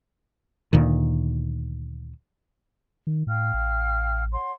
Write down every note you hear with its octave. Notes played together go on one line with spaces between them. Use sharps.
D2 A#2 D#3
D#3
A2 F5 G5 F6
A1
C#5 F#5 C6